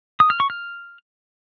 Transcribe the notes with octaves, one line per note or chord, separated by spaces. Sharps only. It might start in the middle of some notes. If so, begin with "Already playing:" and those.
D#6
F6
C#6
F6